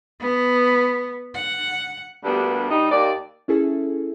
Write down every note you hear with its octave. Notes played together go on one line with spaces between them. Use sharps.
B3
F#5
D2 G2 G3 A#3 B3 D4
G3 D#4
D#2 D5
C#4 E4 G#4 A4